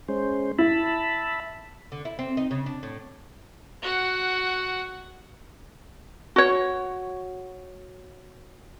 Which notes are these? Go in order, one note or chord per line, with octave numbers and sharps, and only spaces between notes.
G#3 C#4 C5
E4 E5 A5 B5
D3
E4
C4
D#4
C#3
D4
A2
F#4 F#5
F#4 C#5